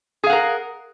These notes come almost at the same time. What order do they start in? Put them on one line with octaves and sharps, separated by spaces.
G#4 F5 F#5 A#4